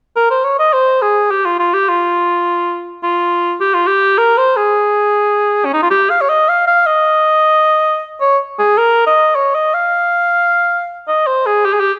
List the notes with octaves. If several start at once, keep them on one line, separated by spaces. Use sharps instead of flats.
A#4
C5
C#5
D#5
C5
G#4
G4
F4
F4
G4
F4
F4
G4
F4
G4
A#4
C5
G#4
C#4
D#4
F4
G4
F5
C#5
D#5
F5
F5
D#5
C#5
G#4
A#4
D#5
C#5
D#5
F5
D#5
C5
G#4
G4
G#4
G4